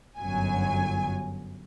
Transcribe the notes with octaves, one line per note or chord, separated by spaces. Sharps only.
G1 F#2 F#3 G#5